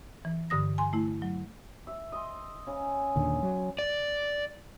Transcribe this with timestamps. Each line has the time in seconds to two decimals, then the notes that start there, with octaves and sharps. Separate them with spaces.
0.25 E3
0.50 G2 D3 D#6 A#6
0.78 G#5 C6
0.93 A3 E4
1.22 F#3
1.87 E5
2.12 D#5 C6
2.67 C#3
3.16 D#2 A#2 D3
3.43 F#3
3.79 D5